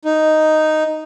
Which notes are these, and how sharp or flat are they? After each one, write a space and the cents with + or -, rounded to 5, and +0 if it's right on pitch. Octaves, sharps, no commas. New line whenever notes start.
D#4 +0